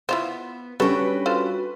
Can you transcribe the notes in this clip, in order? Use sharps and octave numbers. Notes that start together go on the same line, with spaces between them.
B3 E4 F4 C5
G3 C#4 D4 F#4 A4 B4 G5
F4 A4 C5